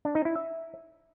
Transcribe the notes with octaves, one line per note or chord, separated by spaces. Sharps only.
D4
D#4
E4
E5